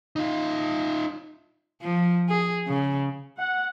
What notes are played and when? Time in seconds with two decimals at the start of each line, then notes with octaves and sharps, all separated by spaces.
0.16 D#4 F4
1.82 F3
2.28 G#4
2.67 C#3
3.37 F#5